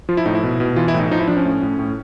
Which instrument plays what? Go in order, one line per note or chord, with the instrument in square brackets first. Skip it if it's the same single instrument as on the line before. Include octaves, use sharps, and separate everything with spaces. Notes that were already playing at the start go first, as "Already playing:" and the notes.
[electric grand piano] F3 F4
E4
A2 D#4
E4
B2
B2
E3 F4
E4
A2
D#4
F3 D#4
E4
F3 D4
C#4
A2
A2
A2